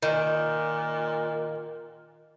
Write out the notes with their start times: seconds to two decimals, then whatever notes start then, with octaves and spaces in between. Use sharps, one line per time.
0.02 A#2 D#3